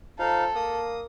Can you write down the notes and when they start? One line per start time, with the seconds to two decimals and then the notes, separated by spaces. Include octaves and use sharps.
0.19 F3 D#4 A4 F5
0.55 A#3 D#6